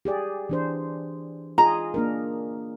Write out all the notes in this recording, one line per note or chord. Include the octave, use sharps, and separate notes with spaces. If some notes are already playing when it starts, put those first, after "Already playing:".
G4 G#4 D5
E3 D4 C5
F4 G#4 D#5 A#5
A#3 D4 A#4